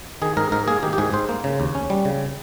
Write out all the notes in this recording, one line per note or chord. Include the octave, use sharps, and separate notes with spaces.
D#3 G#4
G#2 A#4
G#2 A#4
A#3 G#4
D#3 G4
G4
G#2 G#4
G#2 C5
A#3
C#3
D#2
C#4
G3
C#3